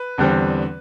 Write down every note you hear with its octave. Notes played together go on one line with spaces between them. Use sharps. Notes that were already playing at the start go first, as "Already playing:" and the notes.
Already playing: B4
E2 D3 G3 C4